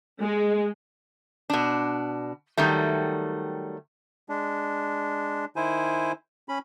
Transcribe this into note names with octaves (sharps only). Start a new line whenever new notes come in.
G#3
B2 D4
D#3 F#3 G3 A3
G#3 D4
D#3 E4 C5 G#5
C#4 B5